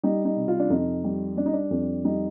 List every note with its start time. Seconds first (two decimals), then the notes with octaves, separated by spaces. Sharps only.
0.03 G3 D#4
0.25 D#4
0.37 C3
0.48 F4
0.59 D4
0.70 F2 D#4
1.04 G3
1.37 G3 D4
1.46 D#4
1.53 D4
1.71 F2
2.05 G3 D#4